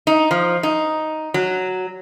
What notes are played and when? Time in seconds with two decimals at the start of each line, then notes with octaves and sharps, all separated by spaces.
0.07 D#4
0.31 F3
0.63 D#4
1.34 F#3